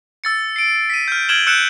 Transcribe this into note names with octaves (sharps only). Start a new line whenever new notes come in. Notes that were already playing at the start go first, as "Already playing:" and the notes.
E6 A6 C#7
C7 D7
B6 D#7
F6 G6
F6 G#6 D7 E7 F#7 G7
E6 F#6 G6 C#7 D7 E7